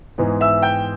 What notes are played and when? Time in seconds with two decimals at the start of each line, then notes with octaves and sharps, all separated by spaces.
0.18 G#2 E3 G#3 B3
0.41 E5 E6
0.62 G5 G6